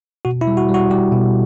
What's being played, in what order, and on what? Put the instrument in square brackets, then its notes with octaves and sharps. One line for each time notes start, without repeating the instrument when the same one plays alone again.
[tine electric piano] B2 F#4
E4
G3
F#4
G3 F#4
G3 G4
B2